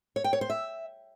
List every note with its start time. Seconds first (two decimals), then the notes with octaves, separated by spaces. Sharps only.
0.16 C#5
0.24 G5
0.33 C#5
0.41 C5
0.50 E5